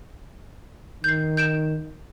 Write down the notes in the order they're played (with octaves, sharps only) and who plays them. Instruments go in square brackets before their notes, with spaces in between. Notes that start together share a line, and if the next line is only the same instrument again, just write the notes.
[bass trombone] D#3 [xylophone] G6 C7
[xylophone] G6 D7 E7